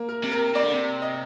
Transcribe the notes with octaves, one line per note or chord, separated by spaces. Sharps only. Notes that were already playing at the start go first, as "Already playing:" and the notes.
Already playing: A#3
A#4
C3
A#4
C3 D5
D3
C3
D#5